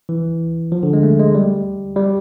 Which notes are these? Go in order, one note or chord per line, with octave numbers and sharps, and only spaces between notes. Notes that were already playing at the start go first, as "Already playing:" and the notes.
E3
F3
D3
G#3
A3
G#3
G3
G3